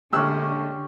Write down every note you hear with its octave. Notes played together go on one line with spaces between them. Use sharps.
A#1 D3 G#3 A3 C#4 G4 E6 F#6